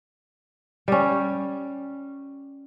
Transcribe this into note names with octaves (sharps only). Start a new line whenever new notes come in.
G3 C#4